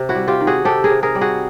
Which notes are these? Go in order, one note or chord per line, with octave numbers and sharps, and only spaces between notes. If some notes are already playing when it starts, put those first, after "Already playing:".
Already playing: C3
E4 F#4
G3
F4 G4
D#3
F#4 G#4
C3 G4 A4
G#4 A#4
C3
G#4 A#4
G3
F#4 G#4